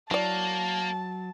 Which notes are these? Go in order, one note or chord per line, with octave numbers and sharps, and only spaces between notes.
F#3 A#3 E4 D5 A5